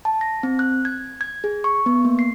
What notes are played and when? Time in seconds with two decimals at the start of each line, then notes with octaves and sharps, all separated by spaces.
0.05 A5
0.21 A#6
0.43 C4
0.59 F#6
0.85 G#6
1.21 G#6
1.44 G#4
1.64 C#6
1.86 B3
2.05 A#3
2.19 C7